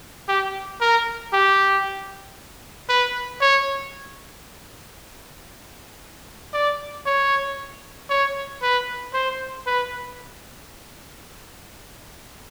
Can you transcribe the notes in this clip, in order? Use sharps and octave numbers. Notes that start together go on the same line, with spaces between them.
G4
A#4
G4
B4
C#5
D5
C#5
C#5
B4
C5
B4